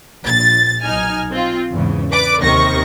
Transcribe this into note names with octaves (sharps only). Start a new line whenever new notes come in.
A#1 A6
B1 D#4 G#5 F6
C4 F4
E2 G#2 C#3
B4 D5 D6
D#2 C3 D#3 C#6 A#6